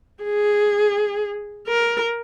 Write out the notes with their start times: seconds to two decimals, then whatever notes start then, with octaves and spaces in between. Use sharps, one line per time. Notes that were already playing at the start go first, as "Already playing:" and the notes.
0.24 G#4
1.67 A#4